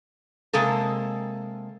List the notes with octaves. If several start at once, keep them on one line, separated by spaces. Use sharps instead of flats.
C3 G#3 A#3 A4